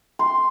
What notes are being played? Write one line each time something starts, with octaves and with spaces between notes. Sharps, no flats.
C6